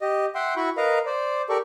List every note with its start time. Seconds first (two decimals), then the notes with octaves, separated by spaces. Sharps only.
0.01 G4 D#5
0.35 E5 F#5 G5 C6
0.56 E4 F#4 B5 C#6
0.77 A#4 B4 D#5 F5 A#5
1.06 C5 D5
1.49 G4 A4 A#4 D5 C#6